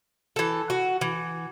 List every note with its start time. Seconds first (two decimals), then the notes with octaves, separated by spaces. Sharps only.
0.36 E3 A4
0.70 F#4
1.01 E3